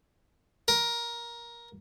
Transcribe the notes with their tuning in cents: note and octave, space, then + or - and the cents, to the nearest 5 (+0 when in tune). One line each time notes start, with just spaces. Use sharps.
A#4 +15